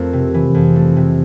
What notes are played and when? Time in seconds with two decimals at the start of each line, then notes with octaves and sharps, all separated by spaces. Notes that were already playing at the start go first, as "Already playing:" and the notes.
Already playing: F2 A3 A#4
0.13 C3
0.34 E3
0.55 F2
0.76 A3
0.97 C3